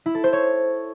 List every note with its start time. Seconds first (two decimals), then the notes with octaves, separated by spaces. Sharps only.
0.06 E4
0.15 A4
0.24 C5
0.33 C#5